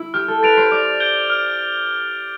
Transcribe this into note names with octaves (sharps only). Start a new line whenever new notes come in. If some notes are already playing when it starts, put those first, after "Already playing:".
Already playing: E4
G4 F6
A4
B4 A6 D7 F7
C5
D5 D6
G6 D7 G7
F6